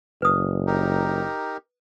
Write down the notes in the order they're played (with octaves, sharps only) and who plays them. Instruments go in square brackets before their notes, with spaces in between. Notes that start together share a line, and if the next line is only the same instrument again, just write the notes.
[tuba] F#1 [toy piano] B4 D#6
[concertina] D#4 G4 A#4